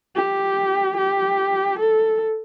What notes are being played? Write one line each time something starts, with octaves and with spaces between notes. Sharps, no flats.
G4
G4
A4